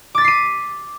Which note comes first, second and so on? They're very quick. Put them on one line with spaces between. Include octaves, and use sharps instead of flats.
D6 A6 B6 C7 D#7